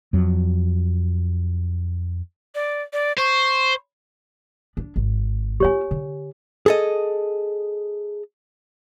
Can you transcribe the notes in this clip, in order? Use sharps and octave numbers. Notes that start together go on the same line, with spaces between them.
F2 F#3
D5
D5
C5 C#6
D4
G#1
B3 F4 G4 C#5 G#5
D3
G#4 A4 D#5